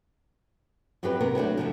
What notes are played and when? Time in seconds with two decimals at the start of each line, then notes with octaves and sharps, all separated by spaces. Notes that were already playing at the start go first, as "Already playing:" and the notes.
1.03 F#2 F#3 C4 G4 B4
1.20 C3 B3 A#4
1.35 F#3 A3 C#4 D4
1.57 E2 C3 F3